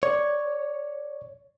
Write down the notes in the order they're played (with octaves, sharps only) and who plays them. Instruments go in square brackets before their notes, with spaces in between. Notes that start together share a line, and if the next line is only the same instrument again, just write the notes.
[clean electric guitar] C#5 [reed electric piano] D5 G#6